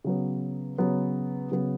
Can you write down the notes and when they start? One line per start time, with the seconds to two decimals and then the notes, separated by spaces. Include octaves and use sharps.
0.04 C#3 F#3 B3
0.78 C#3 F#3 B3
1.51 C#3 F#3 B3